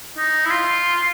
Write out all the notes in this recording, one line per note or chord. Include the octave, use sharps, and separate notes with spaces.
D#4
E4
F4